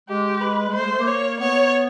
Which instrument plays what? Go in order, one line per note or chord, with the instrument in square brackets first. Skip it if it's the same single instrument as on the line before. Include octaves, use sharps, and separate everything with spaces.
[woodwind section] G#3 [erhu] G4
[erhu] B4
[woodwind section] G#3
[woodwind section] A3 [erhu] C5
[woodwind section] G#3
A3
A#3
[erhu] C#5
[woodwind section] B3 [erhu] C#5